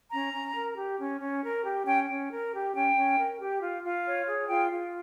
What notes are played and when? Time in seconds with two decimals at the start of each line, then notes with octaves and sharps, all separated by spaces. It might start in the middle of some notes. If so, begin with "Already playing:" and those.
0.11 C#4 A#5
0.32 C#4
0.55 A#4
0.76 G4
0.99 C#4
1.20 C#4
1.42 A#4
1.64 G4
1.86 C#4 G5
2.09 C#4
2.30 A#4
2.52 G4
2.74 C#4 G5
2.96 C#4
3.18 A#4
3.39 G4
3.61 F4
3.83 F4
4.06 C#5
4.27 G#4
4.48 F4 G5
4.71 F4